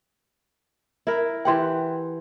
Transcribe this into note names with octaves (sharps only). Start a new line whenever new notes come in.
E4 A#4
E3 G4 F#5 G5 C6